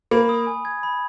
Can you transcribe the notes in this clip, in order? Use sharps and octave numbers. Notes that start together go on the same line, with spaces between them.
A#3 B5
D#6
G#5
G#6
B5